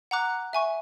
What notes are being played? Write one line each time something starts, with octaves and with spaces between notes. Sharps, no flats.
F#5 A#5 D6 F#6
E5 G#5 C#6